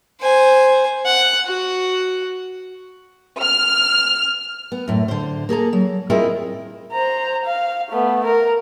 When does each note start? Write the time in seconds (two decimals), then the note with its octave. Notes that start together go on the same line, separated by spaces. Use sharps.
0.21 C5 G#5
1.06 F#5
1.46 F#4
3.40 F6
4.72 B3
4.88 F#2 A2
5.08 D3 C5
5.49 A#3 G#4 A4 A#5
5.73 F#3
6.10 C4 E4 F4 G#4 A#4 D#5
6.92 C5 A#5
7.46 F5
7.89 A3 B3
8.25 A#4